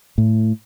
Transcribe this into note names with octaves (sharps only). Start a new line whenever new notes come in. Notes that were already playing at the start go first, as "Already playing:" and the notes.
A2